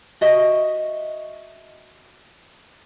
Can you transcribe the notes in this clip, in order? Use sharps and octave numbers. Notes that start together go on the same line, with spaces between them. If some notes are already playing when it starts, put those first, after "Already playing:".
F#4 D#5 E5